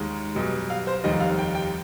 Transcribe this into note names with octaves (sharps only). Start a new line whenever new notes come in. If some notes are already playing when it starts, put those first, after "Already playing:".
Already playing: D#2 D#3 G#3
B1 B2 G3
F5
C5
F1 D#2 D#3 G3 D#5
F5
G5
G5